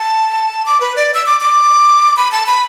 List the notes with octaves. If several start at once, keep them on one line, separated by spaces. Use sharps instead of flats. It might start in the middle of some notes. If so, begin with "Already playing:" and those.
Already playing: A5
D6
B4
D5
E6
D6
D6
B5
A5
B5